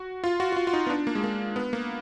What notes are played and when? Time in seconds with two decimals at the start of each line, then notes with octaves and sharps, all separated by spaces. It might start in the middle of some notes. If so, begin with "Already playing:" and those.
Already playing: F#4
0.24 F4
0.40 F#4
0.52 F#4
0.56 F4
0.67 F4
0.73 D#4
0.87 B3
0.90 D4
1.07 A#3
1.15 G#3
1.24 A#3
1.56 B3
1.73 A#3